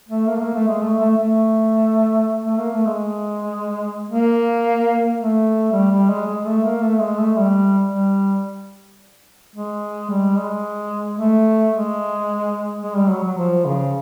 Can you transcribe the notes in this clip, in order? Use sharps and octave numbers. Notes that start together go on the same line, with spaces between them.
A3
A#3
A3
A#3
A3
G#3
A3
A3
A3
A3
A#3
A3
G#3
A#3
A3
G3
G3
G#3
G#3
A3
A#3
A3
G#3
A3
G3
G3
G#3
G3
G#3
A3
G#3
G#3
G3
F#3
F#3
F3
C#3